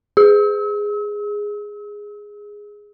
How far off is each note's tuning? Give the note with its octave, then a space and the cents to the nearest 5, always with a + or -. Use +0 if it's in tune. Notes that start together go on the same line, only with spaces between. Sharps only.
G#4 -5 E6 -40